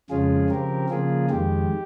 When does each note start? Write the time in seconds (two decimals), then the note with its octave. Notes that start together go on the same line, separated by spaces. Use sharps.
0.10 F2 C#3 F3 G#3 C#4 F4 G#4
0.50 C#3 F3 C4 G4 A#4
0.89 C#3 F3 A#3 F4 G#4
1.30 F2 D#3 G#3 G4